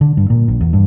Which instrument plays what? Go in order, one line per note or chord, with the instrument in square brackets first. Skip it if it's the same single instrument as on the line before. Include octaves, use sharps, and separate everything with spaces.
[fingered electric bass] D3
G2
A#2
A#1
E2
G2